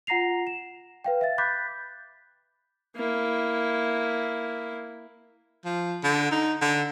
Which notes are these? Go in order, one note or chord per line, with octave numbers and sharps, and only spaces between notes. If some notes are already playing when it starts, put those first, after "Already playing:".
F4 F#5 A#5 A#6 C7 F7
E7
B4 F5 G5
E5 F5 A6
B5 D6 F#6 G6 A6 B6
A#3 E4
F3
D3
D#4
D3